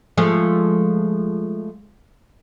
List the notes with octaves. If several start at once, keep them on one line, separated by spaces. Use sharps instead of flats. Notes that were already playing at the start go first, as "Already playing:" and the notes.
F3 G#3 A3